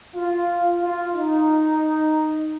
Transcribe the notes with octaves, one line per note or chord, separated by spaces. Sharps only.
F4
F4
D#4